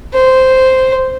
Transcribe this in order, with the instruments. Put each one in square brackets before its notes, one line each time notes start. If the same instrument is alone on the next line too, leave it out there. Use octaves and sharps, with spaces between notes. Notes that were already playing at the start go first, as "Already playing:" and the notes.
[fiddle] C5